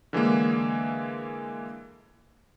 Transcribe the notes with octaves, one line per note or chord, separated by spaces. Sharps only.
D3 E3 G#3 A#3